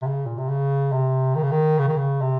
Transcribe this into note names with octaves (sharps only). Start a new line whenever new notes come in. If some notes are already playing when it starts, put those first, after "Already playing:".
C3
C#3
A#2
C3
C#3
C3
D#3
C#3
D#3
C#3
D#3
C#3
C3